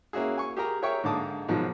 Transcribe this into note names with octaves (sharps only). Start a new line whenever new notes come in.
A#3 C#4 E4 F#4 G#4
G#5 C#6
G4 G#4 A#4 A#5
G#4 A#4 C#5 E5 G5 C#6
G#2 D3 A#3 A5 D6 D#6
G#2 B2 D#3 F3 F#3